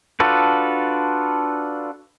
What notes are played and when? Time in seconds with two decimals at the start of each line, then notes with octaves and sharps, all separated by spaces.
0.20 D4 F4 F#4 A4 B4